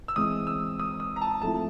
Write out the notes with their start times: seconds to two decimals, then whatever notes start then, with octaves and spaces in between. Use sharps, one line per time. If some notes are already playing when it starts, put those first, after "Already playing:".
0.08 E6
0.16 E3 G#3 C4 E4 D#6
0.47 E6
0.80 D#6
1.00 D#6
1.16 A#5
1.21 A5
1.42 F3 A3 C4 E4 A5